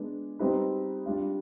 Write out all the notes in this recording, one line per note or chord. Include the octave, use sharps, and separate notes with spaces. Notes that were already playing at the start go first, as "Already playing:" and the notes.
Already playing: G#3 B3 D4 G#4
G3 C4 D#4 G4 B4
G3 D4 F4